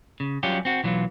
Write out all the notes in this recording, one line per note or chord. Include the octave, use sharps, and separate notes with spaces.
C#3
F#3 G3 C#4 F4 G4
C4 F#4
B1 E3 F#3 F4